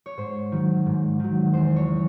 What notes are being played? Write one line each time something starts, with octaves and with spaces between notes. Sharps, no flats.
C#5
G#2 C5
D#3 F#3
G#2
D#3 F#3
E2 C5
C#5
C#3 F#3